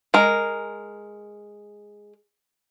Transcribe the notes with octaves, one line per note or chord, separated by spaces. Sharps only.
G#3 A#4